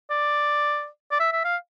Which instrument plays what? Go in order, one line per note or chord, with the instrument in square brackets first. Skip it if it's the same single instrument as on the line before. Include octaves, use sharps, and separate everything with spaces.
[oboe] D5
D5
E5
E5
F5